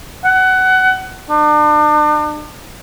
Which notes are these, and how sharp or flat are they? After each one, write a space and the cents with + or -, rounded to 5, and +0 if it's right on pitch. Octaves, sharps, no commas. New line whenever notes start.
F#5 +20
D4 +40